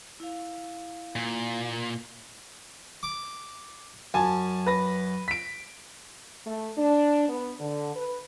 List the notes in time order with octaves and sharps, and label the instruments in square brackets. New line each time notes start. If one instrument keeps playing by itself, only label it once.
[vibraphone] E4 F5
[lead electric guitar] A#2
[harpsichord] D6
[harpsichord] F#2 [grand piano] G#5 A5
[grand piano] B4 A#6
B6 D7
[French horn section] A3
D4
B3
D3
B4